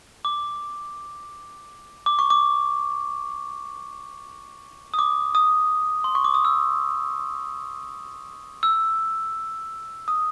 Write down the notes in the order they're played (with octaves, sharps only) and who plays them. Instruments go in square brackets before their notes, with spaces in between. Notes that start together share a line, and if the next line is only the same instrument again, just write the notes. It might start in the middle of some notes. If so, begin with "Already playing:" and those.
[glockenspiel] D6
D6
C#6
D6
D#6
D6
D#6
C6
C#6
D6
D#6
E6
E6
D#6